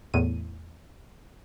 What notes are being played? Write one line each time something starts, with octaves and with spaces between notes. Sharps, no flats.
E2 A2 D#7